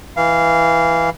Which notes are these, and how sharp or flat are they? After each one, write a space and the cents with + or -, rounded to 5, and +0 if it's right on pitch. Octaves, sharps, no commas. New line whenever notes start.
E3 +0 F5 -15